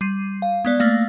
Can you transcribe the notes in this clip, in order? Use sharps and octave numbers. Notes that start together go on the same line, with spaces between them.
G3 C7 D#7
F5
G#3 B3 D5
A3 A#3 F5